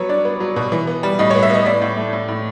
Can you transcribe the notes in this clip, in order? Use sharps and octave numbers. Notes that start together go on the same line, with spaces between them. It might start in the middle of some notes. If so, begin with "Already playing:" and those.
Already playing: F#3 G3 B3 C#5
D4 D5
B3
F#3
B2
E3
B3
G3
A2 D#5
C#5
B3
E5
B3 D#5
A2 D5
A2
A3
A2
A2